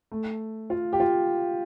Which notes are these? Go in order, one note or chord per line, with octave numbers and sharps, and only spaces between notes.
A3
F4
G4
F4